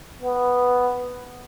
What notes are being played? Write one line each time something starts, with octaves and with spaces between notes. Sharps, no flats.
B3